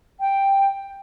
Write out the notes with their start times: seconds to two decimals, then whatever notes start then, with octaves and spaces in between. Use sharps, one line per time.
0.20 G5